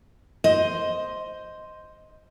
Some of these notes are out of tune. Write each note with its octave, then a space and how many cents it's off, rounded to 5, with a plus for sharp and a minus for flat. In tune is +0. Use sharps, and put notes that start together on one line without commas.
C5 +0 D#5 +5